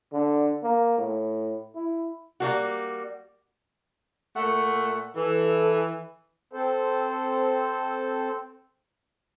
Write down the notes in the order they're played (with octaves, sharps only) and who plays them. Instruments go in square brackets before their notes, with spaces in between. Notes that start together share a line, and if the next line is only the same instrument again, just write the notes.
[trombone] D3
A#3
A2
E4
[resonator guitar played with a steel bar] G3 A#3 F#4
[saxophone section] A#2 A3 F#5
[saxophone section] E3 [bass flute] A4
[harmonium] C4 A4 C5